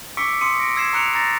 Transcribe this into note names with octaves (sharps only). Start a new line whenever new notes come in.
C#6 D6 E6 B6 C#7 D7
C6 D#6 C#7 D#7
A#6 D7
E6 G#6 C7 E7
A#5 C#6 F#6 C#7 D7 F7
A#5 A6 A#6